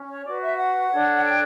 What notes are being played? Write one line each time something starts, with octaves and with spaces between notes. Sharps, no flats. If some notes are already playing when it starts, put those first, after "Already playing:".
Already playing: C#4
C#5
F#4 B4 D5
E5
F#5
D4 A4 C#5
G5